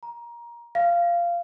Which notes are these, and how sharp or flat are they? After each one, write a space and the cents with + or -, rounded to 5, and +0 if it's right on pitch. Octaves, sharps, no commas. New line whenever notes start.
A#5 +20
F5 -15